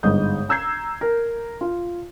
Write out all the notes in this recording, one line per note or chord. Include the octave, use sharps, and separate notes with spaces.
G1 G#2 D#5 D#6 G6
A#5 E6 G6 G#6 C7
A#4
F4